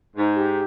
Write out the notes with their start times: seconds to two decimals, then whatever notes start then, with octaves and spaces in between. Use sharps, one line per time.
0.16 G#2 D#4
0.37 G4